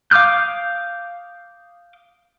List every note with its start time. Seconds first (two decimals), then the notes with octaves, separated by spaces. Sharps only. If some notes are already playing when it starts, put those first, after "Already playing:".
0.11 F5 D6 D#6 F6 G6